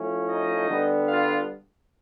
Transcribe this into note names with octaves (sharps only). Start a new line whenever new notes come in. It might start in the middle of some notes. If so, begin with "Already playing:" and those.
Already playing: F3 A3 C#4 E4
D#4 D#5
D3 G3 B3
F4 F5